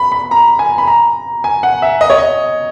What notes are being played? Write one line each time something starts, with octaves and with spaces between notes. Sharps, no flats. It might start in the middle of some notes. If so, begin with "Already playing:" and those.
Already playing: B5
B5
A#5
G#5
B5
A#5
G#5
F#5
E5
D#5
C#5
D#5